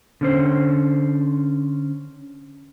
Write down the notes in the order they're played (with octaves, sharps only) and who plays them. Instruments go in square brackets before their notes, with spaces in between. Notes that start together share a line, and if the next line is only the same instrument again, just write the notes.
[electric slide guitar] D3 C#4 C5